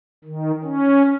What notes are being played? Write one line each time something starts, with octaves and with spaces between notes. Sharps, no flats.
D#3
C#4